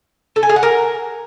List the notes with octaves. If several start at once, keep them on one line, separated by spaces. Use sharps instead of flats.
A4
G#5
G#4
F#5
A#4